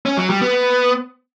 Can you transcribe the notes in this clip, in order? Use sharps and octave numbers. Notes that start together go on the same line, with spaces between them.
C#4
F#3
G3
B3